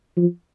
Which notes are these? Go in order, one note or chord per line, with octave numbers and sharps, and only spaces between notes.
F3